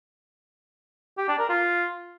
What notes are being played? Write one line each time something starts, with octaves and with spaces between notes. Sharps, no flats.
G4
D4
A#4
F4